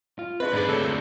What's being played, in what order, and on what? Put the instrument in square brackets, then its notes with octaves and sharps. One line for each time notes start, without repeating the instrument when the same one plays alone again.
[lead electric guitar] F4
[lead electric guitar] C4 D4 [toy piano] G#4 D#5 C#6 [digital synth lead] B4
[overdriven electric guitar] G#2 D5 [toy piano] G#4 D#5 B5
[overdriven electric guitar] D2 A#2 [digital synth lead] A4 [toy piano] A#4 C#5